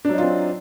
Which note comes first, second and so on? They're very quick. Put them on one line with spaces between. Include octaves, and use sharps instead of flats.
D4 F#3 D#4 F4 C4